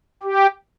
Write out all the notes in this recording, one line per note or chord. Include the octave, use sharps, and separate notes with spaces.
G4